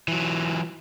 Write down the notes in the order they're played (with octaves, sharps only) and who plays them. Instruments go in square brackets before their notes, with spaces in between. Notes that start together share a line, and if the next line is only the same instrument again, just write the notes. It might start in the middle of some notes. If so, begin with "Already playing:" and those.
[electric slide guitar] E3 F#3